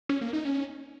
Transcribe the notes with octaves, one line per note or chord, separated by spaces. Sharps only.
C#4
A#3
D#4
C#4